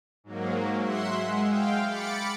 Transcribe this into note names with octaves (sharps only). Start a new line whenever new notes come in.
G#2 F#3 A#3
E5 F#5 C6
G#3
F5 G5
B5 D6 A6 C#7